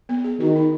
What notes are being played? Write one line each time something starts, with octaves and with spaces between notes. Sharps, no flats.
B3
G#4
D#3 F#4
D#4